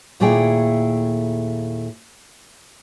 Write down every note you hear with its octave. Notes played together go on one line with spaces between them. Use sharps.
D#2 A#2 A3 E4 G#4 G5